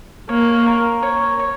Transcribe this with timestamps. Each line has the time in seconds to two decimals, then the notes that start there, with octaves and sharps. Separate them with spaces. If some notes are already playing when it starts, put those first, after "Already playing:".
0.29 A#3 C#5
0.66 A#4
1.03 C#5
1.39 C#5